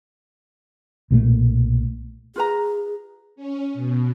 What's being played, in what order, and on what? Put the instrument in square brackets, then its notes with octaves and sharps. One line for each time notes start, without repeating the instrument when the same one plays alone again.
[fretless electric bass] B1 A#2 F#3 A3
[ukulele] F4 B4 A#5 [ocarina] G#4
[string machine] C#4
B2